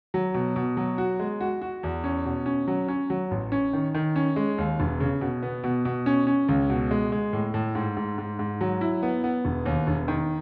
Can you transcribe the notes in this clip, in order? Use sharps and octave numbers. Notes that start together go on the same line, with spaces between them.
F#3
B2
B2
F#3
F#4
G#3
F#4
F#4
E2
C#4
B2
C#4
F#3
C#4
F#3
A1
C#4
D#3
D#3
C#4
G#3
D#2
E1
C#3
B2
B3
B2
B2
C#4
C#4
C#2
B2
G#3
G#3
A2
A2
G#2
G#2
G#2
G#2
F#3
E4
B3
B3
E1
D#2
E1
D#3